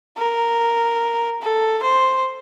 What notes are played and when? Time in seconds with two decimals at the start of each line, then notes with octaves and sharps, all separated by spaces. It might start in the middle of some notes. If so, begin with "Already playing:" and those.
0.18 A#4
1.42 A4
1.83 C5